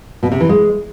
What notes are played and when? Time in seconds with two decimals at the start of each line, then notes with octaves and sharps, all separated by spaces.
0.23 B2
0.32 C3
0.40 E3
0.49 G#3